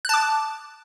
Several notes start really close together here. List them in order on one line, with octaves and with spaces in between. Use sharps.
F#6 A5 D6